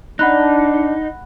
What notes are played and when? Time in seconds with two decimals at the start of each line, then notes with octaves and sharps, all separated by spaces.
0.19 D4 D#4 F#5 B5 F#6